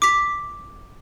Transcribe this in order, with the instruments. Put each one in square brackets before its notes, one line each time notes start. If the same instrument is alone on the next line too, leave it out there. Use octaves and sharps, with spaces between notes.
[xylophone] D6 B6